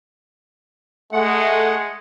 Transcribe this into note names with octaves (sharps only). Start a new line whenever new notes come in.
G#3 A3 F#5